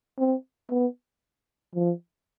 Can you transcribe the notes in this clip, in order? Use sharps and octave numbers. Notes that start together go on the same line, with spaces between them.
C4
B3
F3